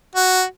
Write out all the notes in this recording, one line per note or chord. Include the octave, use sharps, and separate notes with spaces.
F#4